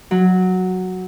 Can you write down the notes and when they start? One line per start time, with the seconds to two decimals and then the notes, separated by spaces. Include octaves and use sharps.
0.11 F#3